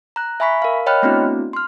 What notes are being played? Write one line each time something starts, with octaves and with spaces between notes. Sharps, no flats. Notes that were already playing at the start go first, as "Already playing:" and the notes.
A#5 F#6
E5 G#5 B5 C#6 B6
A#4 F5
C#5 D#5 G5 B5 F6 F#6
A3 B3 C4 D4 E4 F#4
C6 F6